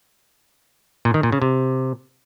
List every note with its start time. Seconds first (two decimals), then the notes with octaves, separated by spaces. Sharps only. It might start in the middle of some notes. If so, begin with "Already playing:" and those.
1.05 A#2
1.14 D#3
1.23 A#2
1.32 C#3
1.42 C3